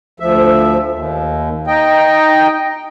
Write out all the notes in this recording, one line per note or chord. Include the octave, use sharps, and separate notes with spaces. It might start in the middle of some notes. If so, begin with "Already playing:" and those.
D2 F3 E5
D#2
D#4 D#5 G5